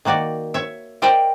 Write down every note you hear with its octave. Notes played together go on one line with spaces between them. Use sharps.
D#3 A#3 F#4 D5
C#5 E5
G4 A#4 C5 D5 D#5 G5